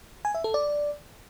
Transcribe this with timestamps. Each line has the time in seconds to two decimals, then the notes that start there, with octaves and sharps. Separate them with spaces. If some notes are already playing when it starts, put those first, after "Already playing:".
0.25 G#5
0.35 E5
0.44 A4
0.54 D5